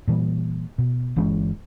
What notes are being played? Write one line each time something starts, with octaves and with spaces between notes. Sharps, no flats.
A#2 E3 G3
B2
G1 E3 G#3 C#4